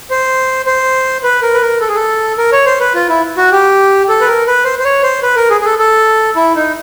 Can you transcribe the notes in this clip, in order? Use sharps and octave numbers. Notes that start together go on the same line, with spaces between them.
C5
C5
B4
A#4
B4
A#4
A4
G#4
A4
A#4
C#5
C5
B4
F4
E4
F#4
G4
A4
B4
A#4
B4
C5
C5
C#5
C5
B4
A#4
G#4
G#4
A4
A4
E4
D#4